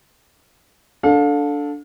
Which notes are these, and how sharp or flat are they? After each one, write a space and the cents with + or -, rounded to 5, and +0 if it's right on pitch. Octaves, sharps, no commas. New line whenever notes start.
D4 -10 A4 +0 F5 +35